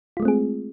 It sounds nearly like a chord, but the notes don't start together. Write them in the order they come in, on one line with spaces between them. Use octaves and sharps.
F4 G#3 A3 C4 G#4